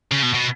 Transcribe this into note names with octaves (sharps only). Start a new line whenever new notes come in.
C#3
B2
B2